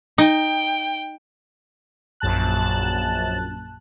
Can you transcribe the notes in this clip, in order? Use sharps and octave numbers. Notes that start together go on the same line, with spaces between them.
D#4 G5
A#1 F#2 A5 F#6